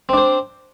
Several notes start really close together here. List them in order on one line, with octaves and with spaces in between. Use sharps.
C4 D4 C5